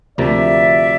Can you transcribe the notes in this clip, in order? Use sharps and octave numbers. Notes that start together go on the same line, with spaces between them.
D2 C3 F3 A#3 D5 E5